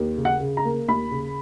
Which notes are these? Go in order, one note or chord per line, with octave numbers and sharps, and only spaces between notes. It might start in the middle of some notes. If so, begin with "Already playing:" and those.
Already playing: D#2
C#3
F#5
C#3
A#5
A#3
D#2 B5
C#3